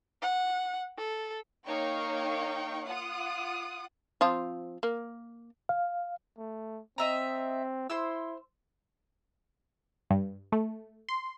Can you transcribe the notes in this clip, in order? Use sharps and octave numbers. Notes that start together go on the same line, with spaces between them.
F#5
A4
A#3 D#4 C#5 F5 G5 C#6
F4 F#5 D#6
F3 C4 F4
A#3
F5
A3
C4 D#5 E5 A#5
E4 C5 C6 E6
G2
A3
C6